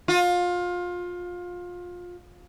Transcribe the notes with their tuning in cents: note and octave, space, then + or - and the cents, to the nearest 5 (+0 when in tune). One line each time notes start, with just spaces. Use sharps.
F4 +25